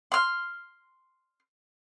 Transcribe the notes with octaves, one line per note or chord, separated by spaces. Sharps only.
C6 F6